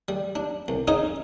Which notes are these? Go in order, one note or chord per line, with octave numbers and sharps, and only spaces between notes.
G3
D4
C2
C#4 D#4 G#4 D#5 G#5